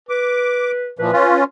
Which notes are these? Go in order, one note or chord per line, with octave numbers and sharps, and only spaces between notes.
B4 D6
A#2 E3 F3 B4
C#4 F4